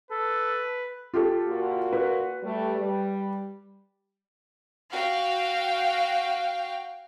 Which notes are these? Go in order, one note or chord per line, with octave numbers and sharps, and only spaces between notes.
A4 B4
F4 G4 A4
A#2 A#3 F#4
B4
G3 A3
G3
F#4 F5 G5